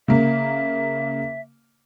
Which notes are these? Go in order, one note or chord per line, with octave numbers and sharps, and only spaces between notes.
C#3 A#3 E5